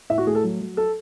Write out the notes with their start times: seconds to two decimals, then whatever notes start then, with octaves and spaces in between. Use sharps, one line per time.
0.10 A2 E5
0.18 F#4
0.27 A3 G#4
0.35 A4
0.43 F#3
0.61 F#3
0.77 A4